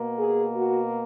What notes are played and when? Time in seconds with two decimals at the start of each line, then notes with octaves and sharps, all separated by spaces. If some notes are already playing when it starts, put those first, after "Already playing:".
Already playing: B2 A#3
0.19 G#4
0.54 F#4